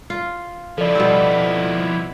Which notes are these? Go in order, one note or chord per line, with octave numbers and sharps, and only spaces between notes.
F4
F3 E4 A4 D5
B2 G3 C4